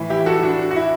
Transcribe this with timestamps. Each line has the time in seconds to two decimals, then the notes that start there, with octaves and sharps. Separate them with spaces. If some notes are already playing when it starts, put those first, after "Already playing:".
Already playing: A2 E3
0.10 E4 G4
0.26 F#4 A4
0.42 D4 F#4
0.71 F#4
0.76 E4